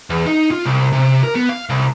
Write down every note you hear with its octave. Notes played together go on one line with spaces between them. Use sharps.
E2
D#4
F4
C2
C3
A#4
B3
F5
C2